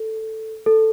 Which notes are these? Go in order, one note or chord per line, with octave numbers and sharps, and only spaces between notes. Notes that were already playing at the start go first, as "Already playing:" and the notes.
Already playing: A4
A4